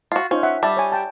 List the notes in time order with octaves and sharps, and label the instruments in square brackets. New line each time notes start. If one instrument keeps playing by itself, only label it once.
[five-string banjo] F4 F#4
[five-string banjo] C#4 [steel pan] D#4 F4 C5
[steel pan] E5 F#5
[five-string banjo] G3 [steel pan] E5 A5
[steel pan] C#5 G#5
G5 A5